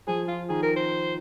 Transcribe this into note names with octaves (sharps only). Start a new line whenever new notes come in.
F3 G#4
F4
D#3 G#4
A#4
C5